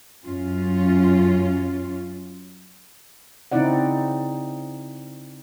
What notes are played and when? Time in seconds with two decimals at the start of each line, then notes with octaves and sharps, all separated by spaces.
0.25 F#2 C#4 F4
3.52 C#3 C4 D#4 E4 D5 F#5